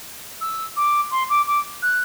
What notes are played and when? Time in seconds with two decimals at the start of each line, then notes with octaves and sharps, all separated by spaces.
0.41 E6
0.76 D6
1.11 C6
1.29 D6
1.47 D6
1.82 F#6